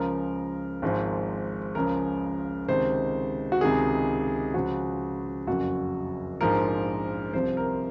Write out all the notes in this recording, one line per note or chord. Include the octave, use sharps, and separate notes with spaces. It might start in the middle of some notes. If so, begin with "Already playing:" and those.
Already playing: C#2 C#3 F3 A#4
G#1 G#2 F3
C#2 C#3 F3 A#4
C#2 C3 D#3 C5
F#4
C#2 C3 D#3 G#4
C#2 C#3 F3 F#4
F#1 F2 C#3 F#4
A#1 G#2 F3 A#4
C2 C3 F3 C5
A#4